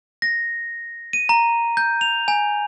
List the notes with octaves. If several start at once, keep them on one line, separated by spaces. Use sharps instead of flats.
A#6
D#7
A#5
G6
F7
G#5